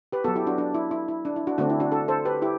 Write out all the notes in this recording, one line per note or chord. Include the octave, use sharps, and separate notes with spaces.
G4 B4
F#3 B3 F#4 A4
E4 G4
D4 F#4
D4
E4
E4
E4
D4
E4
D4 F#4
D3 A3 C4 D4 F#4
E4
D4 F#4
F#4 A4
A4 C5
G4 B4
E4 G4